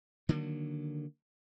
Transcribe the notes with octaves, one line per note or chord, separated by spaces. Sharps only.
D3 D#3 F#3 A#3